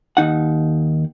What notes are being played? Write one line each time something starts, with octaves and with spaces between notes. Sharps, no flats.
D#2 D#4 F#5